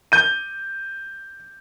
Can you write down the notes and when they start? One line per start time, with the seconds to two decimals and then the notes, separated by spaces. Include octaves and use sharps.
0.12 G6 D#7